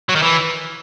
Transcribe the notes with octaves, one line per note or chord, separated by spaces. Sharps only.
F#3
D#3
E3